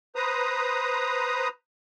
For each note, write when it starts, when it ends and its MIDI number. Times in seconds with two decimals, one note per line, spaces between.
0.16 1.48 71
0.16 1.48 72
0.16 1.48 82
0.16 1.48 87